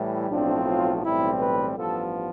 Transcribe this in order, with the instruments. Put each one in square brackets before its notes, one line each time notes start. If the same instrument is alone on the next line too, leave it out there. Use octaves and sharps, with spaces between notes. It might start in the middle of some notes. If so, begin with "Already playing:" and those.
Already playing: [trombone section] A2 E3 G3
B1 A2 F3 C4 D4
F4
B1 A2 E3 G3 C4 E4
B4
A1 G2 F3 B3 A4